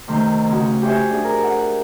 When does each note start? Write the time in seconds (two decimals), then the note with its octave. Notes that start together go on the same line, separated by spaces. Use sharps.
0.08 C3 D#3 A3 C5
0.49 C#3 C4 F#4
0.82 G4 C5 C#5 E5 G#5
1.11 D4 G#4
1.24 A#4
1.44 F#5